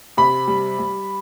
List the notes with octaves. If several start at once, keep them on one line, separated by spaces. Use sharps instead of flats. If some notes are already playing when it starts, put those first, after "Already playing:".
C3 B5
G3
G3